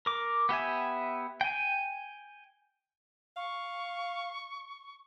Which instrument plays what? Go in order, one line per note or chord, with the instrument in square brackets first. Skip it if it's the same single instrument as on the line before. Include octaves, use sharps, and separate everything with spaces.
[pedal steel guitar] A#4 D6
B3 G4 E5 G#5
G5 G#5
[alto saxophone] F5 [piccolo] C#6